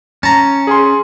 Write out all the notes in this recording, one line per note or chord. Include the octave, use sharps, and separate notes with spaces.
C#4 A5 A#5
G#4 G#5 C6